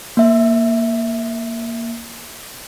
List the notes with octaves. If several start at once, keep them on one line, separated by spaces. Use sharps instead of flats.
A#3 E5